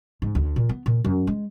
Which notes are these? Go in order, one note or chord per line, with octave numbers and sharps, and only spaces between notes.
G#2
D2
A#2
B3
A#2
F#2
G#3